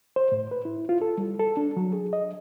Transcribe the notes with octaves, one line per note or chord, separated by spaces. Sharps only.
C5
A2
B4
E4
F4
A4
G3
A4
D4
F#3
G#4
D#5